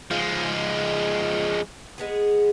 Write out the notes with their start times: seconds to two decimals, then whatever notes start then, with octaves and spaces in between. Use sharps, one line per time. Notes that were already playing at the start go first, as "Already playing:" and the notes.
0.11 F3 G#3 F4
1.98 G#3 B3 G#4